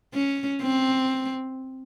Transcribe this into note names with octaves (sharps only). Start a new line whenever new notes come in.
C#4
C4